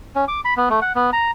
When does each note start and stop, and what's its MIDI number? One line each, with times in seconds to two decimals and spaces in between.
0.16 0.25 61
0.28 0.41 86
0.45 0.54 83
0.57 0.69 59
0.70 0.80 57
0.82 0.93 78
0.95 1.10 59
1.13 1.31 82